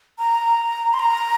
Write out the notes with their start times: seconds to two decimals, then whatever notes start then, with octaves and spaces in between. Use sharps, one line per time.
0.19 A#5
0.94 C6
0.99 A#5